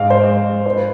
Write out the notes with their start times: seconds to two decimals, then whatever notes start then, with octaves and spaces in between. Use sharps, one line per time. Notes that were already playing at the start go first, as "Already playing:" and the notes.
Already playing: G#2 F5
0.10 C5
0.66 C5
0.76 B4